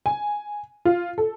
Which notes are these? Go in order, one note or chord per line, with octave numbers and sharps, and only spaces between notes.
G#5
F4
A4